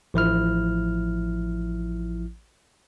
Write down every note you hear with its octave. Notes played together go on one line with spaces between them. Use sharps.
A1 F3 E4 F6